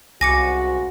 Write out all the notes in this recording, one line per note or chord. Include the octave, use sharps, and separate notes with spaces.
C2 G#2 C#3 F#4 G#5 D6 A#6 C#7